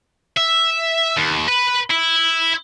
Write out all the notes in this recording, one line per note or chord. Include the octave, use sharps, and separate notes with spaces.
E5
D#2
B4
E4